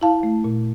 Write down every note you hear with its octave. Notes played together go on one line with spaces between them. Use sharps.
E4 F5 A5
A3
A#2